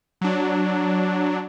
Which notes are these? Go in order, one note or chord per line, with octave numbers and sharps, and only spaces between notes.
F#3 D4